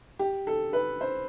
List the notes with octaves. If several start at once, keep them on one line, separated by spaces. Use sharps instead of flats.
G4
A4
B4
C5